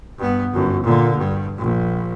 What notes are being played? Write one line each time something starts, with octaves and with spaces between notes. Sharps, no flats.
G2 B3
G1 F#2
A#2 D3
G2
A#1